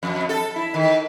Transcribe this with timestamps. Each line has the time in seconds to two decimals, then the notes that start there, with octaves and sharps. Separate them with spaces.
0.03 F2
0.29 A4
0.56 E4
0.74 D#3